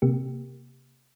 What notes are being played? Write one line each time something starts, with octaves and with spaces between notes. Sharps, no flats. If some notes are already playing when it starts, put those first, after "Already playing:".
C3 A#3 G4